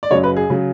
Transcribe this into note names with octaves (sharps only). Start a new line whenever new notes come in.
D5
F#1 F#2 C#3 F#3 C#5
B4
G#4
C#3 F#3